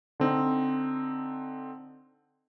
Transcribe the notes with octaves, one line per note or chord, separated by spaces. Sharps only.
D3 C4 D#4